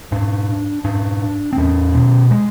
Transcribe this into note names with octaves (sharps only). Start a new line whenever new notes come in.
G#2 D4
G#2 D4
C4
E2 C#4
B2
G#3